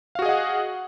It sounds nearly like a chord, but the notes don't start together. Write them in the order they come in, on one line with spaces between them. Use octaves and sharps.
F5 F#4 G#4 D#5 F#5